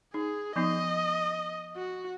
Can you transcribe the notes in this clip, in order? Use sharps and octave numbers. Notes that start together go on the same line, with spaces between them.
D#4 G#4
F3 B3 D#4 D#5
F#4